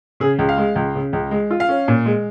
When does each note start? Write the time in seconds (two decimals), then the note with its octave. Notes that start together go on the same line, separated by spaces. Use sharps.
0.20 C#3 G#4
0.39 C#2
0.49 F5
0.58 G#3
0.76 C#2
0.95 C#3
1.13 C#2
1.31 G#3
1.51 F4
1.60 F5
1.69 C#4
1.88 A#2
2.06 G#3